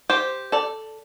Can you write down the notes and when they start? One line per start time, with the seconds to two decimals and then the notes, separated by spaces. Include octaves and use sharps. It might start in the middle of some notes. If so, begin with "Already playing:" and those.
0.10 G4 C5
0.52 A4 D5